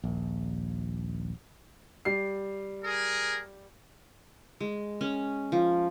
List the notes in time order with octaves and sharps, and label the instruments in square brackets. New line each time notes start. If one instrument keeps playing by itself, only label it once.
[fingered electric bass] D#1 A#1
[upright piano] G3 C7
[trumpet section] G#4 A#4
[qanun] G#3
C#4
F3